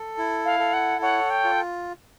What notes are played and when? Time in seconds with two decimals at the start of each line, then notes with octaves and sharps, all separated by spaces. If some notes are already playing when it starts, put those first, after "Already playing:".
Already playing: A4
0.18 E4
0.45 F5
0.60 A4
0.73 F#5
1.02 C#5 F#5
1.30 G5
1.44 F4